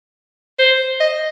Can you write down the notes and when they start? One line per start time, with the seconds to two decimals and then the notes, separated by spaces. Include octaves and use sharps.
0.59 C5
1.00 D#5